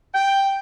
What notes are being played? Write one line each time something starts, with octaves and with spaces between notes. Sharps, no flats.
G5